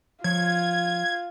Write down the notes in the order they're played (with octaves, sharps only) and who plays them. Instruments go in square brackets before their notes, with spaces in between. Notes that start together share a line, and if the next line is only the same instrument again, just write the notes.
[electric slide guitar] F3 C#5 [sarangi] F4 [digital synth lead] G#6